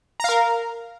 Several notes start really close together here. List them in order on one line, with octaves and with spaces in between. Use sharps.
A#5 F5 A#4